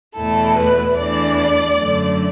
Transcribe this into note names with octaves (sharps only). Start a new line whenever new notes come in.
E2 B2 A3 E4 A4
B4
E2 E3 A3 D4 D5
F#2 D3 F#3 A3